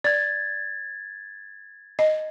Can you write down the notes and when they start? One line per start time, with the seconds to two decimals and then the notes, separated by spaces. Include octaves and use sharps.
0.04 D5 G#6 A6
1.99 D#5